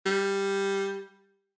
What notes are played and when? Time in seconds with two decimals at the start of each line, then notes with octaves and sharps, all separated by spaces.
0.06 G3